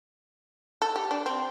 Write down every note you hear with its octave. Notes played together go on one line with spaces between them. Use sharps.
A4
G4
D4
C4